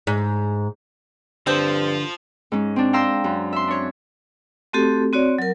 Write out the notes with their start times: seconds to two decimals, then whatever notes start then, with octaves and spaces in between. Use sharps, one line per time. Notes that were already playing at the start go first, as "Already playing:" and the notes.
0.07 G#2
1.47 G2 D3 F3 C4
2.52 G#2 C#4
2.76 C4 D4
2.93 F5 G5 A#5 C6 E6
3.24 F#2
3.53 E5 C6
3.67 D4 C#5
4.73 A3 C4 F#4 G4 A4
5.13 C4 F#4 C#5 D5
5.38 F#3 A#4